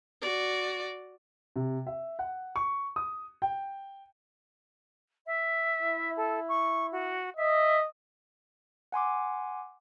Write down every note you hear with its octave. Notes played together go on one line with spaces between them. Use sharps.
F#4 D5
C3
E5
F#5
C#6
D#6
G5
E5
E4
A4
C#6
F#4
D#5 E5
F#5 G#5 C6 D6